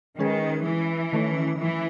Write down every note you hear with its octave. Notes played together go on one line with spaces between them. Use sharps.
D#3 G#3 C#4 G#4 B4
E3
D#3 A3 C#4
E3